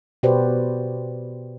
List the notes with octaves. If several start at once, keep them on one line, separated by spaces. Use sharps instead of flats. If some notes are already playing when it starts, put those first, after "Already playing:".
B2 F#4 G4 B4 C5 D5